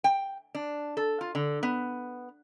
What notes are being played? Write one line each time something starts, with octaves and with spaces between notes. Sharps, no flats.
G5
D4
A4
F4
D3
B3